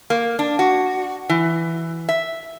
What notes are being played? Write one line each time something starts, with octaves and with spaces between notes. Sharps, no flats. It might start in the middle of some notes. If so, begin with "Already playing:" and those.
A#3
D4
F#4
E3
E5